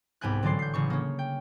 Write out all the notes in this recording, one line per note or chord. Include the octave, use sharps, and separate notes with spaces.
C2 G#2 B3 G5 G#5 F#6
A1 D3 F#3 D5 C6 C7
G6 C7
A1 C#3 C#6
A#3 C#4
G5